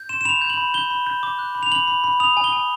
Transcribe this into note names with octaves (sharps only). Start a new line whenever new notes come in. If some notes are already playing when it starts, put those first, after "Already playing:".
Already playing: G6
C6 E7
E7
B5 F7
G6
F#7
B5
G6 G7
B5
G6
D6
F#6
B5
F7
B5 F#7
B5
B5
D#6 F7
G#5
G7
G#5